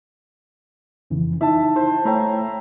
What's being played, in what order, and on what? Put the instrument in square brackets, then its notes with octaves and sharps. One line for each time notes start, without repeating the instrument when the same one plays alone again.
[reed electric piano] F2 C#3 E3
[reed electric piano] D#4 E4 [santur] E5 A5
[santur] C5
[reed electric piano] A3 C#5 G5 [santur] E4 A#5